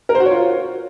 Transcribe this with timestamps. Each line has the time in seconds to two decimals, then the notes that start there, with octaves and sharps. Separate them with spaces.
0.09 A#4
0.15 C5
0.20 F#4
0.26 C#5
0.31 F4